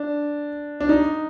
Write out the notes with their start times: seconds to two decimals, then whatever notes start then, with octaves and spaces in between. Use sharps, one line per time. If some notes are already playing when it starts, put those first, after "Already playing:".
Already playing: D4
0.80 D4
0.89 D#4